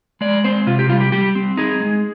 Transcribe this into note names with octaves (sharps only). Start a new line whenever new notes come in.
G#3 D5
C4 C5
C3 F4
G4
G3 F4
G4
G3 G4
C4
D#4 G#4
G#3